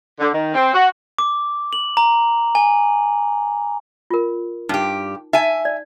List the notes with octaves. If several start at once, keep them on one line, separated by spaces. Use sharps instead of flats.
D3
D#3
C4
F#4
D6
F#7
A#5
G#5
F4 A#4
G2 D#4 G4
D#4 E5 G#5
D5